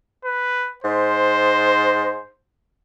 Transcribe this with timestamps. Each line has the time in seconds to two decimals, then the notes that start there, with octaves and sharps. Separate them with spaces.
0.25 B4
0.84 G#2 C5